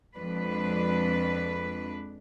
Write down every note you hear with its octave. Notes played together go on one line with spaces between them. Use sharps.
F2 G#3 D4 B4